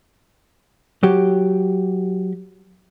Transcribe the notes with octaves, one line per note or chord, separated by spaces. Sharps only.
F#3 G4